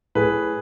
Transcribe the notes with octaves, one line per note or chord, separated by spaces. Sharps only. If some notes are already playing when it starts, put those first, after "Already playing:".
A2 G#4 B4